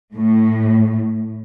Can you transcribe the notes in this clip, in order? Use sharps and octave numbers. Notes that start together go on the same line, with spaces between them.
A2